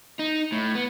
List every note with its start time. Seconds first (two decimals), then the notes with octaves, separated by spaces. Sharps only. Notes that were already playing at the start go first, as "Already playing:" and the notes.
0.19 D#4
0.52 A2
0.75 B3